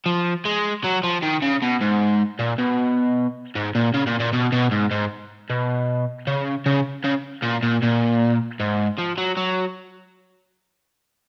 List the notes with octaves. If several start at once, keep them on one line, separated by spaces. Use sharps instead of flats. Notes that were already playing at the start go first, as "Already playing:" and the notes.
F3
G#3
F#3
F3
D#3
C#3
B2
G#2
A#2
B2
G#2
A#2
C#3
A#2
A#2
B2
B2
G#2
G#2
B2
C#3
C#3
C#3
A#2
A#2
A#2
G#2
F3
F#3
F#3